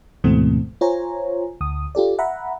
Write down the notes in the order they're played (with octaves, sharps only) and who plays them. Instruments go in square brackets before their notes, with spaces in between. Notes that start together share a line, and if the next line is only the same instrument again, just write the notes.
[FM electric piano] D2 G#2 B2 E3 A3 C4
F4 C5 C#5 G#5 A#5
D2 D#6
F4 G4 A4 D5
E5 F#5 A#5 B5